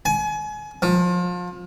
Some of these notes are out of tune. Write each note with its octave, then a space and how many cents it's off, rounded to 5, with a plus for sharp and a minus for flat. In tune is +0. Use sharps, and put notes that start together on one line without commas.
G#5 +30
F3 +30